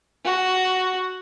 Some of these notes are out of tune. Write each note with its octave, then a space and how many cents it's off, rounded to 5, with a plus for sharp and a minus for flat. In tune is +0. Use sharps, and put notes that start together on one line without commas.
F#4 +5